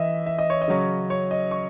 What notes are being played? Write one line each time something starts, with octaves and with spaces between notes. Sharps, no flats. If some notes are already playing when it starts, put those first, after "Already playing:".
Already playing: E3 D#5 E5
E5
D#5
C#5
D#5
C#3 F#3 C#4
C#5
D#5
C#6